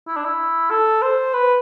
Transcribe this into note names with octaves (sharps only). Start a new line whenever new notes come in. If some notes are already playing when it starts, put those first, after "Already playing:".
E4
D4
E4
A4
C5
B4